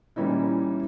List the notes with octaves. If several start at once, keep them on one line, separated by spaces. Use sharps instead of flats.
A#2 E3 G3 C#4 D#4 E4